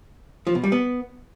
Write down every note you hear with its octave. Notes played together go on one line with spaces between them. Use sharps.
F3
B2
G3
B3